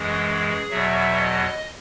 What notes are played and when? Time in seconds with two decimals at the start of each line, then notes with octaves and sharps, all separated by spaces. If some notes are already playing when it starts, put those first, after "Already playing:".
Already playing: F#2 E3 G#3 G#4
0.70 E2 B2 F#3 E5
1.15 D#5